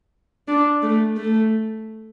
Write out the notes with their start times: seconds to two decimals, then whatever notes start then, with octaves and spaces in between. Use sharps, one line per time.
0.48 D4
0.83 A3
1.17 A3